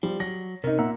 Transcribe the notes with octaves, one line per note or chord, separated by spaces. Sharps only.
F3 G3
F#3 A#6
C3 C#4 D#4 A#4
A#2 E5 F#5 A#5